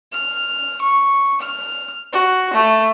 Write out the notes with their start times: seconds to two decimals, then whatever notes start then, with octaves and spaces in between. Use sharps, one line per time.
0.12 F6
0.81 C#6
1.41 F6
2.12 F#4
2.53 A3